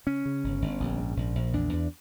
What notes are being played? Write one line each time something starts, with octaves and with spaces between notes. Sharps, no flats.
C#3 C#4
C#3
G1
G1
A#1
G#2
A#1
A#1
E2 D4
E2